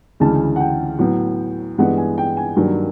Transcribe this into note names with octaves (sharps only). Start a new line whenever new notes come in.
D2 C#3 E3 G#3 A5
F#5
G5
A2 F#3 B3
G2 E3 G#3 B3 F#5
G#5
G5
G#5
G2 D#3 F#3 A#3